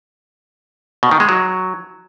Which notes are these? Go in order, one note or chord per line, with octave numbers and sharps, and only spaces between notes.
B2
D#3
G#3
F#3